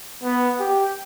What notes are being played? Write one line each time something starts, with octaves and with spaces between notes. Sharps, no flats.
B3
G4